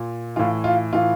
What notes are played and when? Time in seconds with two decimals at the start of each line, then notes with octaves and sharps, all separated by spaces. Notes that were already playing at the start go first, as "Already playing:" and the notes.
Already playing: A#2
0.36 A2 E3 F4
0.64 F4
0.93 A2 E3 F4